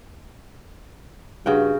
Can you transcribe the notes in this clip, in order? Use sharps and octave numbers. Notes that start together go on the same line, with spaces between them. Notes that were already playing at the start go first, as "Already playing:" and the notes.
G2 C#3 F#4 G5